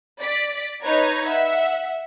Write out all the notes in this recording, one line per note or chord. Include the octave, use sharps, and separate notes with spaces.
D5 B6
D#4 B4 C#5 A#5 G#6
E5 F#5